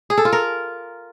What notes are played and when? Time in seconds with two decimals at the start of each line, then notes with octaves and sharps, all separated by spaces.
0.10 G#4
0.18 A4
0.25 F4
0.33 A#4